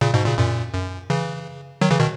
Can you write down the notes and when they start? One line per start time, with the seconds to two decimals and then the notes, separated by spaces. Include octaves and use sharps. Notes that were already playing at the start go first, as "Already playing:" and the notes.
0.01 A#2 C#3
0.14 G#2 B2
0.26 A#2 C#3
0.38 F#2 A#2
0.73 F#2
1.10 C#3 E3
1.81 D#3 F#3
1.91 C#3 E3
2.00 B2 D#3